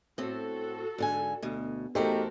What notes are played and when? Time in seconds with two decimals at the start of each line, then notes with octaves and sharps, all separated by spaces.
0.18 A2 C4 F#4 A4
0.98 G#2 D3 G#5
1.42 D2 B2
1.95 E2 A3 D#4 F#4 G4 A4 A#4 C5